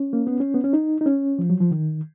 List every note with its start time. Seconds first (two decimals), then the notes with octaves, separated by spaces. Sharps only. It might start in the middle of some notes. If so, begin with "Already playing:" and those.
Already playing: C#4
0.13 A#3
0.27 B3
0.40 C#4
0.55 B3
0.64 C#4
0.73 D#4
1.01 D#4
1.06 C#4
1.39 F3
1.50 F#3
1.61 F3
1.71 D#3